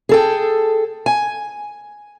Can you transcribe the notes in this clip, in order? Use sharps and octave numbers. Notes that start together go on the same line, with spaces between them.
G#4 A4 G5
G#5